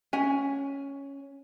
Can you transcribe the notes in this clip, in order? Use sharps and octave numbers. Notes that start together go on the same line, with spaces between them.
C#4 G#5